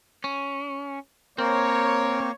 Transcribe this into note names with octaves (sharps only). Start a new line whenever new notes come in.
C#4
A#3 C4 A#4 C#5